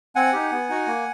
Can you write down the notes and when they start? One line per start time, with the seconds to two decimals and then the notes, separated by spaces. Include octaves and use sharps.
0.16 C4 F#5 G#5
0.33 D#4 G4
0.51 B3
0.69 D#4 F#4
0.87 A#3